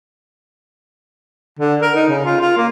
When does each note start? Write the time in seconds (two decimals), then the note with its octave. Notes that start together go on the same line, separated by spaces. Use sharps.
1.59 D3
1.82 A#4
1.95 D#4
2.08 C#3
2.25 F4
2.41 F4
2.57 A#3